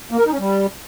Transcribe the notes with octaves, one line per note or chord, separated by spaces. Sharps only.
A#3
A#4
D#4
C#4
G3